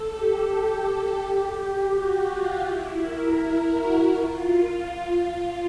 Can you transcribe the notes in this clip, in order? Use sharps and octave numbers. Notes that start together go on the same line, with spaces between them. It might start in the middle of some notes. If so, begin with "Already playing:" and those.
Already playing: A4
G4
F#4
F4
E4
A#4
A#4
F#4
F4